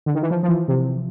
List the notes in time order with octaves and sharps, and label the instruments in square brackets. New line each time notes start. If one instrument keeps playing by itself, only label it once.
[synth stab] D3
D#3
E3
F3
F3
E3
C3